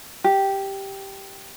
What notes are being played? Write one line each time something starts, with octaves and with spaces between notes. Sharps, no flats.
G4